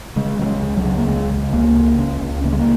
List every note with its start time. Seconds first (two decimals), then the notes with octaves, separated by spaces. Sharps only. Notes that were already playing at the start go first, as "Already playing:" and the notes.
0.16 C#3 G#3
0.39 C#3 F#3
0.46 G#3
0.61 C#2
0.77 F#3
0.85 C#3
0.98 A#3
1.07 C#2 G#3
1.30 C#3
1.53 C#2 A#3
1.76 C#3
1.99 C#2 C#4
2.21 C#2
2.44 C#3 A#3
2.52 G#3
2.59 A#3